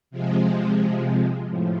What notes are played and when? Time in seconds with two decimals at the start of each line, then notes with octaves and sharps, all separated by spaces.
0.11 C3 F3 G#3
1.48 A2 F3